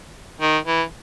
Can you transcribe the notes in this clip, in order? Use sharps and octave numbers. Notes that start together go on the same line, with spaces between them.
D#3
E3